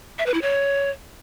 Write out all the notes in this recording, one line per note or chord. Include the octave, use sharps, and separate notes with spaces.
E5
B4
E4
C#5